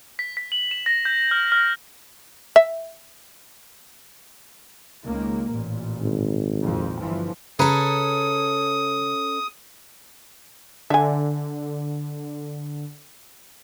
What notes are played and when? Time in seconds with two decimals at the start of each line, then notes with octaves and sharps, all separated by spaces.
0.19 B6
0.37 B6
0.52 F#7
0.71 E7
0.86 A#6
1.05 G6
1.31 F6
1.52 F6
2.56 E5
5.04 C#2 D#3 A#3
5.52 A1 A#2
6.01 G#1
6.57 A#1 F2
6.98 G1 E3 F3
7.59 C#3 C#4 G#4 A4 B4 A#5 D#6
10.90 D3 E5 G#5